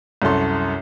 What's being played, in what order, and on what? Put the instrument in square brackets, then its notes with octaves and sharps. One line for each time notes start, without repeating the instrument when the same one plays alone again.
[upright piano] C2 F#2 C#4 A4 C6